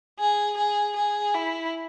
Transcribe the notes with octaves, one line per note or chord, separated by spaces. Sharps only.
G#4
G#4
G#4
E4